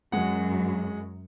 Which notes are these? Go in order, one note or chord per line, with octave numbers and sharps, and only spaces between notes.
F#2 G#3 F#5